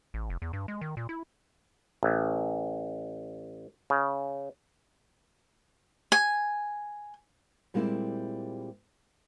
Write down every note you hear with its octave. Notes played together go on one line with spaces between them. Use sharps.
A1
F1
E2
G2
G#3
D#3
A#2
E4
A1
C#3
G#5
A#2 G3 G#3 A#3 C4 E4